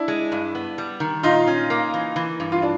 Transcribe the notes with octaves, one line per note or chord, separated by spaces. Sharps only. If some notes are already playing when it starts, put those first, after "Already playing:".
Already playing: D4 E4
G#3
G2
B3
G3
D#3
A#2 D#4 F4
C#4
A#3
E3
E3
G2
F4
D4